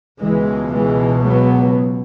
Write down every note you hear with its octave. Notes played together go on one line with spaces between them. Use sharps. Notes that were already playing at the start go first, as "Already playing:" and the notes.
C#2 B2 E3 G#3
E3 G#3
F#3 B3